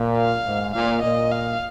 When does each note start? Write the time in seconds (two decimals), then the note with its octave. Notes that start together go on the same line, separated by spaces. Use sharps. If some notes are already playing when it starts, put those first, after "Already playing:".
Already playing: A#2
0.18 F5
0.46 G#2
0.75 A#2 F5
1.03 A#2 D#5
1.32 F5